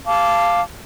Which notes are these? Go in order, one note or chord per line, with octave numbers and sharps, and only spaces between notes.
F5 A5 D6